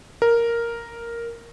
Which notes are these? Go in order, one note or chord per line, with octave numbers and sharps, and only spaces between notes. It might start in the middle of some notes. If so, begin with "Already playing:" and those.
A#4